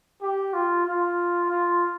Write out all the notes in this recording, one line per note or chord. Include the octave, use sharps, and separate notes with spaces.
G4
F4
F4
F4